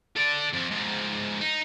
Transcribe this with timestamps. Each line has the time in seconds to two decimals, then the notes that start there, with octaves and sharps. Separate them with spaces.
0.17 A4 D5
0.54 F2 F3
0.71 G#2 F3
1.41 D#4